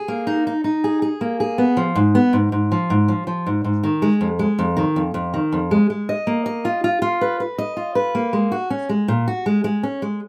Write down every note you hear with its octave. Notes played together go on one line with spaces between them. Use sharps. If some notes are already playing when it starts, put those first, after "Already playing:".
Already playing: G#4
A#3
D#4
D#4
D#4
G#4
G#4
A#3
G#4
B3
F3
G#2
B3
G#2
G#2
F3
G#2
F3
F3
G#2
G#2
D#3
G#3
F2
G#3
F2
D#3
F2
F2
D#3
F2
G#3
G#3
D#5
A#3
D#5
F4
F4
F4
B4
B4
D#5
F4
B4
A#3
G#3
F#4
C#4
G#3
A#2
F#4
G#3
G#3
C#4
G#3